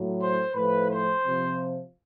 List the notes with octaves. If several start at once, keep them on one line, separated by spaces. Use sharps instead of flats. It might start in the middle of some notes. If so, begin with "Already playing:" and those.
Already playing: A2 F#3
C5
A2 F3 B4
C5
C3 F3